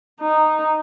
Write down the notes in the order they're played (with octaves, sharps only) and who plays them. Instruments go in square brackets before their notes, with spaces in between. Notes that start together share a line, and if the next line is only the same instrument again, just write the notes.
[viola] D#4